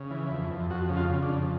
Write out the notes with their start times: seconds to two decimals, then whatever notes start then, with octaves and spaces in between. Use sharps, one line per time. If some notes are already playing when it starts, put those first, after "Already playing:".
Already playing: C#3
0.11 E3
0.31 F2
0.51 F2
0.70 F2 F#4
0.90 C#3
0.97 F4
1.10 C#3
1.23 D4
1.29 F2